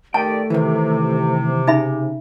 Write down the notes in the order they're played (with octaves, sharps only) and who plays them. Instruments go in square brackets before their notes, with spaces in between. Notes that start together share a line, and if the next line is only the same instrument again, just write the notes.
[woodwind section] D#3 G4 D5 [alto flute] A3 [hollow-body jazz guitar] G5 [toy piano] A5
[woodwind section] C3 [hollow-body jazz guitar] D#3 E3
[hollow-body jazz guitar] C#3 [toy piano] D#4 E5 B5